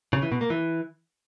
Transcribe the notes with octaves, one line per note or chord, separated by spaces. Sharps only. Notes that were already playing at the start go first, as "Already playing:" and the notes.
C#3
E3
B2
A#3
E3